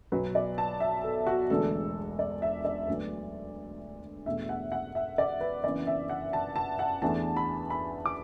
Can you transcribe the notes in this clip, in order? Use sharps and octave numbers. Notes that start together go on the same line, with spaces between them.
B1 B2 F#3 B4
D5
A5
E5
A4
F#4
E1 E2 D3 A3 D4 A4
D5
E5
D5
D2 D3 F#3 B3
E2 B2 A3 D4 E5
F#5
F#5
E5
D5
B4
F#1 F#2 E3 B3 D4 D5
E5
F#5
A5
A5
F#5
E2 E3 A3 D4 A5
B5
B5
D6